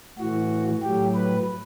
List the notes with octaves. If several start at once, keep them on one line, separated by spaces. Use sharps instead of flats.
A2 E3 F#4
A2 F#3 G4
B4